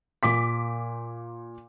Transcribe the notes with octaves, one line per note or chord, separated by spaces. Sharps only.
A#2 D6 B6